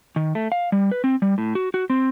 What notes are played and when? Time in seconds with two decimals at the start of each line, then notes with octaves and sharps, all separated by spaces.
0.16 D#3
0.35 A3
0.52 F5
0.72 G3
0.92 B4
1.04 C4
1.22 G3
1.38 A2
1.55 F#4
1.74 F#4
1.90 C4